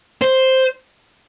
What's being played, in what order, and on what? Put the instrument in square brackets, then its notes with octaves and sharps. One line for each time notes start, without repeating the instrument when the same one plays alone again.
[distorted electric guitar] C5